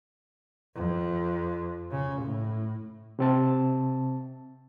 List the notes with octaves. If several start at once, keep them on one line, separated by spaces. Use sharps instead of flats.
F2
C#3
A2
C3 C4 A5